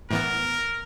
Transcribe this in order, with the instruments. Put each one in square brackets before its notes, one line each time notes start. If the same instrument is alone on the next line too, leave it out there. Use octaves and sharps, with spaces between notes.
[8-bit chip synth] A2 E3 B3 [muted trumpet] A#4